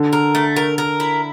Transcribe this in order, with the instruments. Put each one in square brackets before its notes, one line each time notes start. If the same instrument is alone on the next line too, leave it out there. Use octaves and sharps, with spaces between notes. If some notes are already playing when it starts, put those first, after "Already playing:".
Already playing: [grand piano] D3
[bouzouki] A#4
A3
A#4
A#4
E4